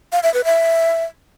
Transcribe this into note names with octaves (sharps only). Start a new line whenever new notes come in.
F5
E5
B4
E5